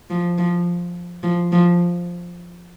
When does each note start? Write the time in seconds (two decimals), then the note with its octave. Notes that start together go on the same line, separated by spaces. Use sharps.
0.10 F3
0.38 F3
1.23 F3
1.52 F3